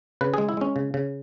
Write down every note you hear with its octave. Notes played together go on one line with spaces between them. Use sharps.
C#3 B4
G#3 G#4
E4
G#3 C#4
C#3
C#3